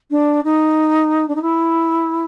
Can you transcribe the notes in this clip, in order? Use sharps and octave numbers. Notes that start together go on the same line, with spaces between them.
D4
D#4
D4
D#4
E4